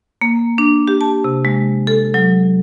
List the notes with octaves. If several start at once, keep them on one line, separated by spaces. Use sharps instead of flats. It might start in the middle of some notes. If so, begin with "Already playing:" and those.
A#3
D4
G4
A5
C3
G#3
A4
F#3